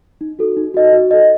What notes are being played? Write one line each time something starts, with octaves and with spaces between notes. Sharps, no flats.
D#4
F#4 A4
D#4
F#4 A4 D#5
F#4
A4 D#5